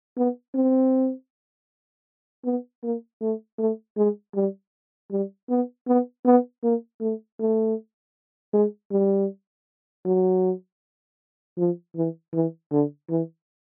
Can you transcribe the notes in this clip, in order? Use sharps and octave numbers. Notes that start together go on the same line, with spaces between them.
B3
C4
B3
A#3
A3
A3
G#3
G3
G3
B3
B3
B3
A#3
A3
A3
G#3
G3
F#3
F3
E3
E3
D3
E3